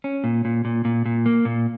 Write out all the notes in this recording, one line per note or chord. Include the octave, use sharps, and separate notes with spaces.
C#4
A#2
A#2
A#2
A#2
A#2
A#3
A#2